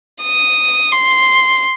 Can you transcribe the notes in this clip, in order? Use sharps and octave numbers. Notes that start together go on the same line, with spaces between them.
D#6
C6